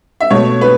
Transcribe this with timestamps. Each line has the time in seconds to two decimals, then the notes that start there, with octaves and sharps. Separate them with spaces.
0.20 E5
0.30 B2 A3 C#5
0.61 B4